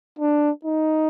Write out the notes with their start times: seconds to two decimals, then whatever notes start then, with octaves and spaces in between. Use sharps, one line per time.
0.19 D4
0.65 D#4